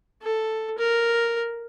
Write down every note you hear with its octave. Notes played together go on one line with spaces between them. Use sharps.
A4
A#4